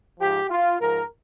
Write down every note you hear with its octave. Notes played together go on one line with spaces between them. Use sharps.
G#2 F3 G4
F4
G#2 F3 A#4